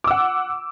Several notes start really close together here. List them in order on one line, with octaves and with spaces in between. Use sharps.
D6 E6 F#5